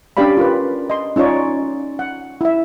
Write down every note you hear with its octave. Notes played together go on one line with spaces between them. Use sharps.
C#4 D4 G4 D5 F5 B5
F4 A#4 B4
D#5 C6
C#4 D#4 F4 C#5 D5
F#5
E4 E5